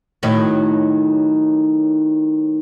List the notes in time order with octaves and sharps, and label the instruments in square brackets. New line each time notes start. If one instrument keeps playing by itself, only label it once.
[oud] A2 D#3 F#3